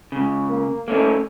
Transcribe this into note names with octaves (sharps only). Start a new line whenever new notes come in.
C#2 C#3
A#3
A3 A#3 C#4 D#4